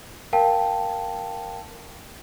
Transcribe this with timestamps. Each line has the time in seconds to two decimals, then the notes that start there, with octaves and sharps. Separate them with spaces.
0.33 A#4 F5 G5 A5